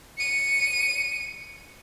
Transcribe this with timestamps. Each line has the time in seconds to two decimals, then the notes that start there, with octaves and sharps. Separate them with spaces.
0.18 C#7 D#7